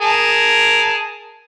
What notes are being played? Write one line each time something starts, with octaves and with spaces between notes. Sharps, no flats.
G#4 A#4 A5